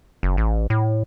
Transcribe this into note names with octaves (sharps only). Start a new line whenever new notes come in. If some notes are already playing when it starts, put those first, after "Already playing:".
F#1
A1
A2